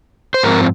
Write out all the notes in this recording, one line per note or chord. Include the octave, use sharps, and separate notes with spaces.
C5
G#2 F3 C4 A#4